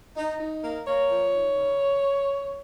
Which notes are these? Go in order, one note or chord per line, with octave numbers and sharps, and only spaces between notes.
D#4
D#4
A#3
A#3 C#5
F3
D#4
C#3